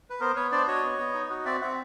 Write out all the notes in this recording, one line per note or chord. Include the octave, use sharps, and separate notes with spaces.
B4
B3 A#4 C5
B3 B4 C#5
D4 C5 D5
F#4 C#5 D#5
B3
B3
D#4
F#4
C4 D5 E5
C4 E5 F#5